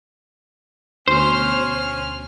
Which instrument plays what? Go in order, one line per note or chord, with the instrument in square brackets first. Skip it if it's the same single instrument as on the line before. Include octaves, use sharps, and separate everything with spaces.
[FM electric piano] D2 B2 [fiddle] C#4 F6 [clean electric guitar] C5